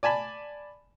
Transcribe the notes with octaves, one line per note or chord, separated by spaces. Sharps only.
D5 G#5 A5 B5